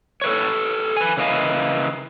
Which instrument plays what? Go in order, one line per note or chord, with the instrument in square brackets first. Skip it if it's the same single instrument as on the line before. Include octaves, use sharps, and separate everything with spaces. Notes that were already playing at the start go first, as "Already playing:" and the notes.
[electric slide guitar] A4 B4 C#5
B4 G#5
C#3 E3 A#3 D#5 F5